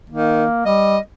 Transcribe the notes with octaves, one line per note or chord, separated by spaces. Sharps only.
D#3 A#3
G3 D#5